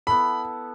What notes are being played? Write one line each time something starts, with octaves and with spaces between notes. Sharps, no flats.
B3 E4 A4 B5